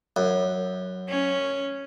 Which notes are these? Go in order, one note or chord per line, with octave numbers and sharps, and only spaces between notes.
F#2
C#4